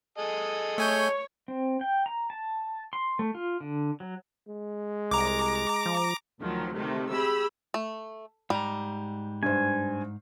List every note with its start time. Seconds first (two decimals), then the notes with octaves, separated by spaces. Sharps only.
0.18 G#4 A4 D#5
0.78 A3 C#5 G#5 G6
1.48 C4
1.81 G5
2.06 A#5
2.30 A5
2.93 C6
3.19 A3
3.35 F4
3.60 D3
4.00 F#3
4.48 G#3
5.11 C2 A#5 D6
5.86 F3
6.42 D2 D#3 F3 F#3
6.74 C3 D#3 A3
7.11 G4 G#4 B5 E6
7.74 A3
8.50 G#2 G3 A#5
9.43 G2 C5 G#5